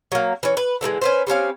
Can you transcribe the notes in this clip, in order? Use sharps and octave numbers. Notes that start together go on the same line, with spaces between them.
F#3 A#3
E3 C#4
B4
D3 E3 G3 G#3
C#4 B4 C5
G3 C4 C#4 F5